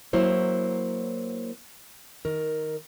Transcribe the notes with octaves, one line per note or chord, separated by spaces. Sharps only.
F#3 A#3 E4 C5 C#5
D#3 A#4